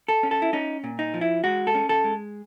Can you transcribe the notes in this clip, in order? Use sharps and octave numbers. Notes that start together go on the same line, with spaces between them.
A4
C#4
A4
E4
C#4 D#4
A#2
D#4
F3
E4
G#3 F#4
A4
C#4
A4
G#3